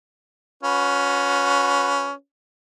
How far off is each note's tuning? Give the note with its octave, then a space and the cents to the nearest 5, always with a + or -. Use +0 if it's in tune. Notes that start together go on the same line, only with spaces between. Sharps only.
C#4 +15 F#4 -35 B4 +0